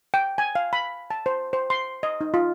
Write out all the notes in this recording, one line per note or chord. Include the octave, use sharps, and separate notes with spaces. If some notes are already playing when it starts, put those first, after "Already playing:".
G5
G#5
F5
B5
A5
C5
C5
C6
D#5
D#4
F4